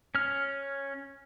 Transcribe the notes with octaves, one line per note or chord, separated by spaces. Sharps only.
C#4 F6